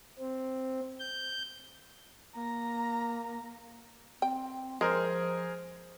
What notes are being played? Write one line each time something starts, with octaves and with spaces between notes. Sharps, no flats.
C4
G6
A#3 A#5
C4 G5
F3 G#3 G#4 A#4 C5